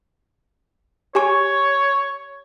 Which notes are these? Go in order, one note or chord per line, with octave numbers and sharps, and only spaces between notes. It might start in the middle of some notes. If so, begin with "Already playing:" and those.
G4 C#5 G#5 C#6